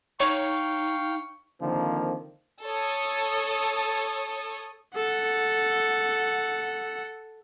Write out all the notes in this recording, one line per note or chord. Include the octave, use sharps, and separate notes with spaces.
D#4 C#5 F5 G5 C#6
D3 D#3 F3 A#3 C4
A4 C#5 D#6
A4 F#5